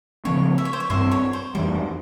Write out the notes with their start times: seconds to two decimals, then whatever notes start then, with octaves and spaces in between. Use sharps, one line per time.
0.25 C#3 F3 C4 C#5
0.58 E5
0.65 C#5
0.73 C5
0.80 C#5
0.90 G2 G3 C4 C5 E5
1.11 C#5
1.33 C5
1.55 F2 E3 G3 C5